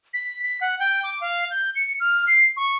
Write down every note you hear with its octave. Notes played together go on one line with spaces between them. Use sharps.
B6
B6
F#5
G5
D6
F5
G6
C#7
F6
C7
C#6